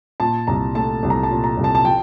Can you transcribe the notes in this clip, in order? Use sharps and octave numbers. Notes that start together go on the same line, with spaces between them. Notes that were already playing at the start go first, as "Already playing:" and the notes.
A#2 A5
C2 A#5
A3 A5
C2
A#5
A5
A#2
A#5
C2
A5
A5
F3 G5